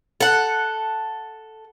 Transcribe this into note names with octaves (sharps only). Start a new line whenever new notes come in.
A4 F#5